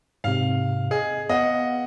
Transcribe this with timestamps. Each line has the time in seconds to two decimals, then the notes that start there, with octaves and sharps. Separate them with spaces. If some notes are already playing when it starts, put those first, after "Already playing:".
0.24 G#2 C3 F5
0.91 G#4 D#5
1.29 B3 D#5 F5 F#5